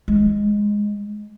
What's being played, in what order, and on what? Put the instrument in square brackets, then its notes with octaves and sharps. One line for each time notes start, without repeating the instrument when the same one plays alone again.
[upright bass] G#3